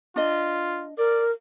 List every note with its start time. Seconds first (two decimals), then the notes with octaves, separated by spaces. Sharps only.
0.16 D4 F4 D#5
0.98 A#4 D5